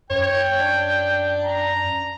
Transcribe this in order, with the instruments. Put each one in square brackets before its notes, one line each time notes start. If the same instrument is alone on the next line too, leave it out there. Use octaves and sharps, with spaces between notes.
[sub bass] F#2 [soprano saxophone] C#5 [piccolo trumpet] G5
[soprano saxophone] D4
[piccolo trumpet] A#5